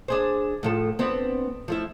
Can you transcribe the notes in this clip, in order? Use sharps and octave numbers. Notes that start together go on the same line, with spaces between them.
D4 G#4 C5
A2 F3 A4
B3 C4 D4
F3 A3 E4